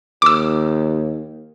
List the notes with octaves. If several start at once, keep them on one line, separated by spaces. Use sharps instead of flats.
D#2 D6 E6